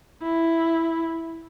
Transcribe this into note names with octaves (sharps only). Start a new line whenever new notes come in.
E4